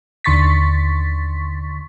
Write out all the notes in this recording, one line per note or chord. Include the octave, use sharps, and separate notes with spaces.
D#2 D3 C6 C#6 A6 B6